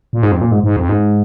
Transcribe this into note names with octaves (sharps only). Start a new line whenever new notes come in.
A#2
G#2
F2
A#2
G#2
G#2
F2
G#2